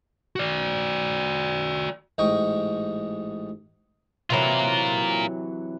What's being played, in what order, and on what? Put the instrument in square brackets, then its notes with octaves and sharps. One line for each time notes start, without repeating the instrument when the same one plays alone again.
[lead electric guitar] F#4 D5
[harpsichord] A1 G#2 D#5 G5 C#6
[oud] C3 E3 F#3 [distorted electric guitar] F4 A#4